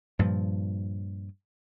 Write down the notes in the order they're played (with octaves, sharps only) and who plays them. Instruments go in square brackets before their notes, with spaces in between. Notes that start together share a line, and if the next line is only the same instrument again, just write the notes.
[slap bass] G2 A#2 F3